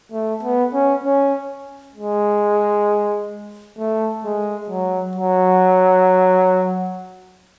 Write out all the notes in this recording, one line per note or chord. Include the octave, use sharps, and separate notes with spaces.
A3
B3
C#4
C#4
G#3
A3
G#3
F#3
F#3